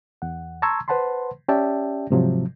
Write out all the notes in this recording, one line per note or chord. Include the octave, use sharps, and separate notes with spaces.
E2 F#5
A5 A#5 C6 C#6 E6 G#6
B4 C5 F#5 A5 B5 C6
C#4 G4 D5 E5 G5 A5
G#2 C3 F3 F#3